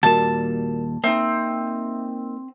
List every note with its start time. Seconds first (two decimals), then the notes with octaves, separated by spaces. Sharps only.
0.03 D#2 A#2 G3 F#4 A#4 A5 E7
1.04 A#3 C4 D#4 E5